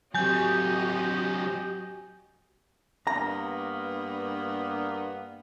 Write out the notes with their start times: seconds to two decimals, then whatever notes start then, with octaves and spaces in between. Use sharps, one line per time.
0.14 F#3 C4 F#4 G4 D#5 G#5 G6
3.07 G2 A#3 B3 A#5